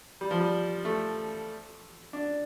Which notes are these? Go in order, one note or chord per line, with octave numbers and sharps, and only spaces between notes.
G3
F3
G3
A3
D4